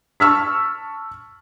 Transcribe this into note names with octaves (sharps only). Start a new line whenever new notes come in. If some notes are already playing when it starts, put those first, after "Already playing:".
A5 C#6 E6 F6 B6